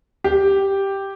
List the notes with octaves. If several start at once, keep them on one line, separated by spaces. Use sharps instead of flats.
G4